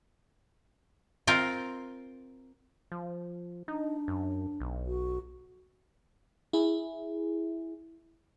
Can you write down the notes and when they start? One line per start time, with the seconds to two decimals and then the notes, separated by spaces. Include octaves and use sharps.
1.27 C4 F4 A#4
2.92 F3
3.68 D4 D#4
4.08 F#2
4.60 B1
4.87 F#4
6.53 E4 G#4